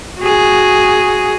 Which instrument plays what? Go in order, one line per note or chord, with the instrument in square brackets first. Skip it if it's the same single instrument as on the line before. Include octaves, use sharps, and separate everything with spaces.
[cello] F#4 G#4